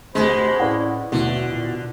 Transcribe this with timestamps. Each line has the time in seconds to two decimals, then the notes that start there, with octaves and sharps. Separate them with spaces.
0.15 F1 D2 B2 G#3 C5 B5
0.60 A2 C#4 E4 B4 D5 F#5
1.12 D#2 B2 D3 E3 A3
1.49 A#2 D#3